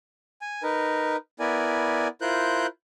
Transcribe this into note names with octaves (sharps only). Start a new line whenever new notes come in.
G#5
D#4 A#4 B4
B3 E4 A#4 D5 G#5
E4 F4 A#4 C5 F#6 G6